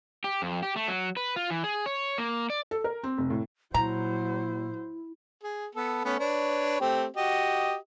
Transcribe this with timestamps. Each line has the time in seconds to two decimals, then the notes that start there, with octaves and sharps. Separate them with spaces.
0.24 G4
0.42 F2
0.63 G4
0.76 A3
0.88 F#3
1.17 B4
1.36 F4
1.50 E3
1.64 G#4
1.86 C#5
2.18 A#3
2.50 D5
2.71 A4
2.84 A#4
3.04 C4
3.18 F1
3.30 A2
3.74 A#2 F#3 E4 C5 A#5
5.43 G#4
5.75 B3 A4
6.05 A3 B3 C#4
6.19 D4 B4 C#5
6.81 A3 C4 G4
7.16 F#4 G4 D#5